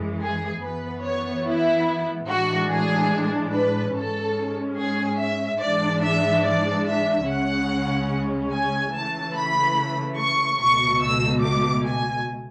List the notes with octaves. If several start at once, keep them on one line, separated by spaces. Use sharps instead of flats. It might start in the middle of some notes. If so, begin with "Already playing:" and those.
Already playing: F#2 E3 G#3
G#4
F#2 E3 B3 B4
C#5
E4
A2 E3 G#3 D4 F#4
G#4
B4
G#2 G#3 C#4 A4
G#4
E5
G#2 E3 G#3 D4 D5
E5
D5
E5
C#2 C#3 G#3 C#4 F#5
G#5
C#3 E3 A3 A5
B5
C#6
C#2 B2 A3 C#6
E6
D6
G#5